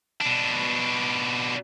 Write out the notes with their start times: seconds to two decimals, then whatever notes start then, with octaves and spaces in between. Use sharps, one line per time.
0.21 B2 D4